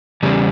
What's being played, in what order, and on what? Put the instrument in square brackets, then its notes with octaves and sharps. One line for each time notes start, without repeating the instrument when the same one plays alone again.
[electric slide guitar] E2 C#3 G3